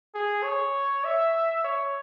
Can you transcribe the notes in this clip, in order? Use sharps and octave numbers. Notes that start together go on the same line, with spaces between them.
G#4
C#5
E5
C#5